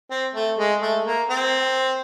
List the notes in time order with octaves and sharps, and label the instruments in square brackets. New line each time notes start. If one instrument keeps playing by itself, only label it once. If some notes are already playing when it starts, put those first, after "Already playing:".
[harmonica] C4
A3
G#3
A3
A#3
C4